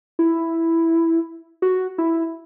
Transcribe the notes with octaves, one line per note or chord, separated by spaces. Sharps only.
E4
F#4
E4